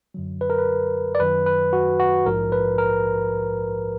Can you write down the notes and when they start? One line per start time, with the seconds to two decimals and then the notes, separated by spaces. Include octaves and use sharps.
0.14 F#2 D3 F#3
0.41 B4
0.50 A#4
0.59 B4
1.15 D5
1.20 F#2 D#3 F#3 B4
1.46 B4
1.73 F#4
2.00 F#4
2.26 A#1 G#2 F3 A#4
2.52 B4
2.78 A#4